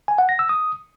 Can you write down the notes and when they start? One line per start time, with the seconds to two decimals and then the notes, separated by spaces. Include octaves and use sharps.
0.08 G#5
0.18 F#5
0.29 A#6
0.39 E6
0.49 D#6